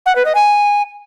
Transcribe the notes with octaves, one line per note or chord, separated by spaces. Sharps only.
F#5
B4
D#5
G#5